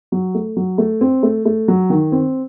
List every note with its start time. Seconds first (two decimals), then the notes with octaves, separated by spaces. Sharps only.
0.12 F#3
0.34 A3
0.57 F#3
0.78 A3
1.01 C4
1.23 A3
1.46 A3
1.68 F#3
1.90 D#3
2.12 C4